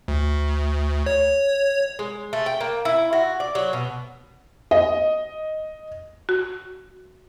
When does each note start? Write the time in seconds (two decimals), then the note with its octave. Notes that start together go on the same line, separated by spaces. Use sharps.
0.08 D2
1.06 C#5
1.99 G#3
2.33 A3
2.46 G5
2.61 A#3
2.85 E4
3.13 F#4
3.40 D5
3.55 F#3
3.73 B2
4.71 D#5
6.29 F#4